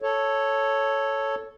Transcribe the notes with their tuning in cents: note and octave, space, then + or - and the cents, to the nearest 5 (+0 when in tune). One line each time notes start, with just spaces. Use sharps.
A4 +0 C#5 +0